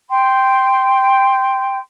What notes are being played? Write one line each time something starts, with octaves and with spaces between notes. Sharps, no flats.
G5 C6